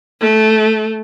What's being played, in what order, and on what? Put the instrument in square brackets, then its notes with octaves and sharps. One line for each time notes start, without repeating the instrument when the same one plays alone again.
[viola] A3